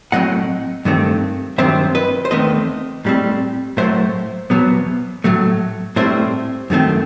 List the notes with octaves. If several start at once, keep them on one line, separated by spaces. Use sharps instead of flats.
A2 F#3 C4 D#5 F#5
G2 D#3 A3 C4
G2 D#3 F#3 C4 C5 E5
B4 D#5
C5
E2 D#3 A3 C4 B4 D#5
A2 G3 C4
A2 F#3 A3 C5 E5
E2 B2 F#3 B3
A2 F#3 A3
A2 G3 C4 C5 E5
F#2 D#3 A3 C4